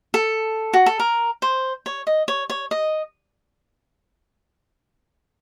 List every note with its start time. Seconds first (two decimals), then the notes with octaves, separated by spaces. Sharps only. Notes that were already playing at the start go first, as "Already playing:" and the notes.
0.14 A4
0.73 F#4
0.86 A4
1.00 A#4
1.42 C5
1.86 C#5
2.07 D#5
2.28 C#5
2.50 C#5
2.71 D#5